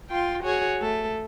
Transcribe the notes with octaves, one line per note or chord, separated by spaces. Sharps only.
F4 G5 C6
F#4 G#4 C#5
A3 A4